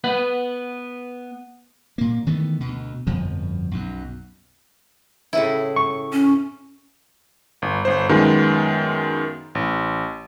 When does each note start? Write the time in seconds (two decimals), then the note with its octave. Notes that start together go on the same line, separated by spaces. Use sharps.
0.04 B3 B4 F#5
1.98 A#2 A#3
2.26 D#3 E3 A3 B3
2.60 D2 B2
3.07 G1 F2 B2 F3
3.71 B1 F#2
5.33 A2 C#3 E4
5.76 C#6
6.12 C#4
7.62 G1
7.85 G1 C5
8.09 F#2 D#3 G#3 B3 F4
9.55 A1